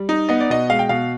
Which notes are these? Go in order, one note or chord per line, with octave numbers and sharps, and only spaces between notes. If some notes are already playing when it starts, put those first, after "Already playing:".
Already playing: G3
D#4
B3 D#5
D5
B2 D#5
G#3 F5
G5
B2 F5